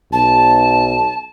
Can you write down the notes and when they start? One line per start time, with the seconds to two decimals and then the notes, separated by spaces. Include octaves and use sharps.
0.13 B1 A5